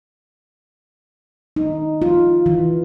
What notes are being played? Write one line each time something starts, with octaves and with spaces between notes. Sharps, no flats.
D#4
F4
E3